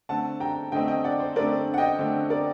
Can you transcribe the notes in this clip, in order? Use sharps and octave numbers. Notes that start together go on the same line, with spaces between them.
D3 A3 C4 F#5 A5
G5 A#5
D3 A3 C4 D#5 G5
D#5 G5
D5 F#5
C5
D3 A3 C4 A#4 D5
F#5
D#5 G5
D3 A3 C4
A#4 D5